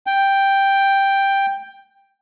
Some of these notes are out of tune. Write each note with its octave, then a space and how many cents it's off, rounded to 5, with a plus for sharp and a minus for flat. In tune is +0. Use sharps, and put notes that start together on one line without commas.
G5 +5